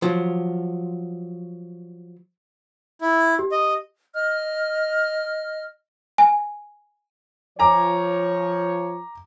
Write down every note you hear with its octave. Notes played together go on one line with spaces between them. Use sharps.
F3 F#3
E4
G4
D#5
D#5 F6
G#5
F3 C#5 G#5 A#5 D6